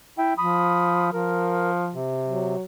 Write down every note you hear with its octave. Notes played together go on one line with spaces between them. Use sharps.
E4 E5 G5
F3 B5 D#6
F3 A#4
C3
F#3